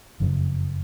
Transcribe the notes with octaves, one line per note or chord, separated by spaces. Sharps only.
F#1 F2 C#3 F#3